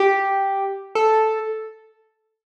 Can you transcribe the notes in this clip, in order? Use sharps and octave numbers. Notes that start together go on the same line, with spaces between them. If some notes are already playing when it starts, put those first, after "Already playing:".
Already playing: G4
A4